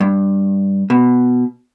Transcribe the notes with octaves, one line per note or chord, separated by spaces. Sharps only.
G2
B2